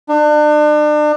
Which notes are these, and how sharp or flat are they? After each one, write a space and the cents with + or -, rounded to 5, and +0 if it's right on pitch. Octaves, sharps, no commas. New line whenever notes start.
D4 +35